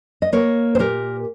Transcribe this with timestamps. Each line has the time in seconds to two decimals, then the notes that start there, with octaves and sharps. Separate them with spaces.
0.22 D#5
0.33 A#3 A#4 C#5
0.75 C5
0.79 A#2 G4 A#4